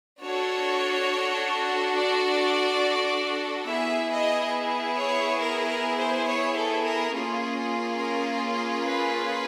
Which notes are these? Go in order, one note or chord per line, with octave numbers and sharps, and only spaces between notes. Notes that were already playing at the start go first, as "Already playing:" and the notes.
D4 F#4 A4 C#5
D5
B3 E4 G#4 E5
D#5
C#5
A#4
A#4
C5
C#5
A4
A#4
A#3 C#4 F4 G#4
A#4
B4